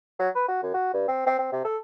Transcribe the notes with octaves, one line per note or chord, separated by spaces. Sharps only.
F#3
B4
F#4
F#2
F#4
G2
C4
C4
C4
C3
A4